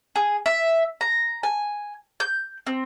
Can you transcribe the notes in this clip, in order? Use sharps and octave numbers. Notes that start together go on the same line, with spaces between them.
G#4
E5
A#5
G#5
G6
C4